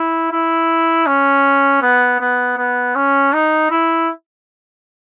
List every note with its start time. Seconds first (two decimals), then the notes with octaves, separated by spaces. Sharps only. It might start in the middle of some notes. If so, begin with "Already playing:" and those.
Already playing: E4
0.31 E4
1.06 C#4
1.82 B3
2.20 B3
2.57 B3
2.95 C#4
3.33 D#4
3.70 E4